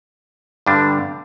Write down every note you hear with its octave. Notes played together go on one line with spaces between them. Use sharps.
G2 D3 G3 D4